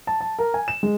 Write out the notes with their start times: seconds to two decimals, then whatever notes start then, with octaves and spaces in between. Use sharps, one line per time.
0.07 A5
0.20 A5
0.39 A#4
0.54 G#5
0.68 E7
0.83 G#3